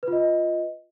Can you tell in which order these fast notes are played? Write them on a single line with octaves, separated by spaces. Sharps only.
B4 F4 D#5